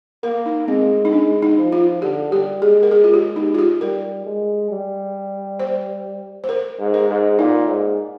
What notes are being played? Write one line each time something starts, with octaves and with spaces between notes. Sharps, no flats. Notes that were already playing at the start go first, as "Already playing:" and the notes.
A#3 A#4
D#4
G#3 C4
D#4
G#3 D4
D#4
F3
F4
D3 G4
G3 G4
G#3 G#4
A#4
G#3 G#4
F4
G4
D#4
F4
G4
G3 A#4
G#3
G3
C5
C5
A#4
G#2
A#4
G#2
A#2 D#4
G#2